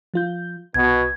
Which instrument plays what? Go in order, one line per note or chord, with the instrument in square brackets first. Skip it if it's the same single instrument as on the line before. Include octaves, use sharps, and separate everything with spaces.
[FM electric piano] F3 F4 G6
[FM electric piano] C2 [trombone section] B2 [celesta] G#6